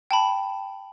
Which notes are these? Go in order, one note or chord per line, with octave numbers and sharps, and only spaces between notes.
G5 A5 B5